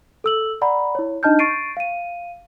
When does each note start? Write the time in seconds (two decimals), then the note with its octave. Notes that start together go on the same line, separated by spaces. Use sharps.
0.24 A4 E6 F#7
0.62 D5 F#5 A#5 B5
0.95 E4 C#5
1.23 D4 D#4 D#5 A5 F6 G6
1.39 C#6 A6 C7 D7 D#7
1.77 F5 D#7